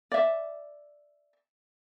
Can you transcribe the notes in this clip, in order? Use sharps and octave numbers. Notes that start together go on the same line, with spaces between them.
D5 E5